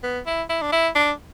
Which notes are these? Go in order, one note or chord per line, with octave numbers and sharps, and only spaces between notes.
B3
E4
E4
D4
E4
D4